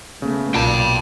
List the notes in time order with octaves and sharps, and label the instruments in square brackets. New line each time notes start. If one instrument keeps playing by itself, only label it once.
[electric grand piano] C#3 [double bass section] A3 B3
[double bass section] B1 [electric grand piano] A#2 [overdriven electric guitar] G5 A5